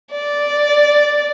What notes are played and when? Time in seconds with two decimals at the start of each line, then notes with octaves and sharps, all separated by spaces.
0.12 D5